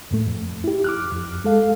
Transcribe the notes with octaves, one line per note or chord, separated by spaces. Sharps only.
F2 A2 A3
F2
E4 G4
D6 F6 F#6
F2
G#3 A4 F5